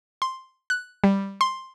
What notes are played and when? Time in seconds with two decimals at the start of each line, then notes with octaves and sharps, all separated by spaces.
0.22 C6
0.70 F#6
1.04 G3
1.41 C6